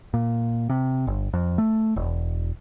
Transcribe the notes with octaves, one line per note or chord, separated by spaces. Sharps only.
A#2
C3
G1
F2
A3
E1